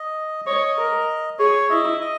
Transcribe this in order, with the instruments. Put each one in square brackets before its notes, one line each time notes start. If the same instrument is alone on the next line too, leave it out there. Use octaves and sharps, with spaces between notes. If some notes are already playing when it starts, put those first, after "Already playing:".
Already playing: [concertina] D#5
[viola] C#5 [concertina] D#5
[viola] A#4
[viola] G#4 [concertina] C#5
[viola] E4 [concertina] D#5
[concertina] D#5